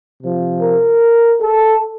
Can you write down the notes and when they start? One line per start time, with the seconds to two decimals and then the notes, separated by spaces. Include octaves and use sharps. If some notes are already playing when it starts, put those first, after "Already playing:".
0.21 C3 F3
0.61 A#4
1.41 A4